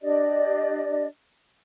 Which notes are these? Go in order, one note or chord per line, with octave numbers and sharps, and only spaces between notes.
D4 G4 D5 D#5